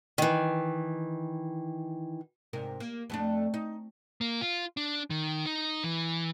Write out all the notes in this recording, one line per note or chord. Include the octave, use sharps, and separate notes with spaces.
D#3 E3
G#2 C3 A#4
A#3
F2 A3 D4
D#4
A#3
F4
D4
D#3
D#4
E3